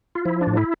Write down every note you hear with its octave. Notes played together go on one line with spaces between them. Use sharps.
F4
F3 E4
D4
A2
E4